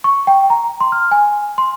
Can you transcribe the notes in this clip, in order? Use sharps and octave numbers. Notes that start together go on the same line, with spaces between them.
C#6
G5
A#5
C6
F6
G#5
C6